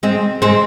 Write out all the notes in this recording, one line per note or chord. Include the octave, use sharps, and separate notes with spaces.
G#3 C4
G#3 C4